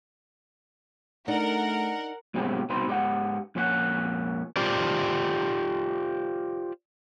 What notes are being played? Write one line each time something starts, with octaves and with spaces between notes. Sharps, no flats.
A3 D4 D#4 A#4 F#5
G2 B2 F#3 G#3 C4 G4
C2 B2 C4 D#4 B4 C6
G#2 G4 C#5 F#5
F2 A#2 C#4 E4 F#5
F4 G4 C5 D5